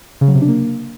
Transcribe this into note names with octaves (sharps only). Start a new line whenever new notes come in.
C#3
F#3
C3
D4
A#3